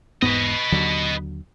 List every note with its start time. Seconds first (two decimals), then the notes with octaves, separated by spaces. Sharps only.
0.22 E1 G#2 B3 B4 D#5
0.72 D#2 D3 F#3